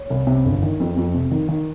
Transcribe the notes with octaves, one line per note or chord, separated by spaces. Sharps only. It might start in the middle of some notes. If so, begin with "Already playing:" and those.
Already playing: C#5
C2
C3
G1
D#3
F2
F2
C3
D#3
D#3